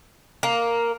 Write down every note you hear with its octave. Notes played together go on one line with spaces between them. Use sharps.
A#3